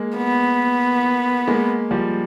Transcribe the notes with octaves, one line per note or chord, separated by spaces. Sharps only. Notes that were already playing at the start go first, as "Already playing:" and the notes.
Already playing: G#3 A#3
B3
G#3 A#3
F3 G3